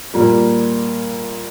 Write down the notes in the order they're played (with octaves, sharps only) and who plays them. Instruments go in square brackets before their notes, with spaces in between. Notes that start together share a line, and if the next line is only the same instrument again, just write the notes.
[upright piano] A#2 G3 A#3